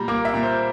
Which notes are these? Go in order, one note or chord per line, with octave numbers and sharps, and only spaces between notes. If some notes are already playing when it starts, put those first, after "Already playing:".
Already playing: A#2 G3 A#5
A#3 D6
E5
A#2
C5